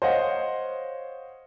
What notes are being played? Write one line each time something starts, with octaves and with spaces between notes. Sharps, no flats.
C5 C#5 D#5 F5 F#5